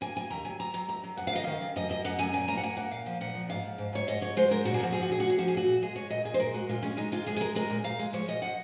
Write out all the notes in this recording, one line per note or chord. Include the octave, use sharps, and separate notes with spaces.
A#3 G#5
A#3 G#5
D#2 A#5
F#3 G#5
F#3 A#5
F#3 A#5
D#2 A#5
F#3
F#2 F#5
F5
D#3 D#5
D#3 F5
F#2
F#2 D#5
F#2 D#5
F#2 F#5
F#2 G#5
A#2 G#5
A#3 A#5
F#5
A#3 G#5
A#3 F#5
A#2 F5
F3
A#2 F#5
F3
G#2 F5
F3
G#2
G#2 C#5
G#2 D#5
G#2 C#5
G#3 C5
G#2 A#4
A#2 F#4
G#4
F3 F#4
F3 G#4
F#4
A#2 G#4
A#2 F#4
G#4
F3 F#4
G#4
A#2 F#4
A#2
G#3 G#4
G#3 C#5
A#2 D#5
A#2 G#4
C5
A#2 A#4
G#3 F#4
A#2 F4
G#3 C#4
G#3 D#4
G#3 F4
G#3 G#4
G#4
G#3 A#4
G#3 A#4
A#2
A#2 F5
G#3
F3 C#5
A#2 D#5
F3 F#5